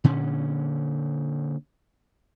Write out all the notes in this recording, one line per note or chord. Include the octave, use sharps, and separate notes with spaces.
A#2 D3 C#4